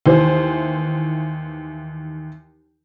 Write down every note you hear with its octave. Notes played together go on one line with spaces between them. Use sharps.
D#2 E3 C5